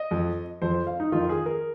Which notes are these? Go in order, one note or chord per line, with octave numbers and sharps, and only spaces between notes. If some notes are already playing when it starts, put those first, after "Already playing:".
Already playing: D#5
F2 F3
F2 F3 C5
C5
F5
D#4
F2 D#3 F4
G#4
A#4